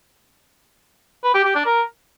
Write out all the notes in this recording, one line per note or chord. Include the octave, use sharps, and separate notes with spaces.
B4
G4
G4
D4
A#4